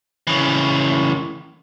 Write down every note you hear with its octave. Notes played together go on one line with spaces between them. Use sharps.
C#3 E3